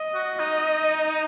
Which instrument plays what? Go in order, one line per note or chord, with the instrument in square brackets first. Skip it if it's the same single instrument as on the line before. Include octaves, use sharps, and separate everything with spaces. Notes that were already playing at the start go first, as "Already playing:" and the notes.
Already playing: [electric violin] D#5
[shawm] F#4
[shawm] D#4 [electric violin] D#5